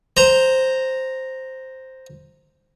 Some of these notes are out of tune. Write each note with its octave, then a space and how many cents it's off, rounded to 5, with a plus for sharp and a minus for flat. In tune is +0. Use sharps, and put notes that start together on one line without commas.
C5 +0 A#5 -5